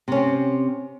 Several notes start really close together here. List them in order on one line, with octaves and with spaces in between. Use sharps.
C3 C#4 C4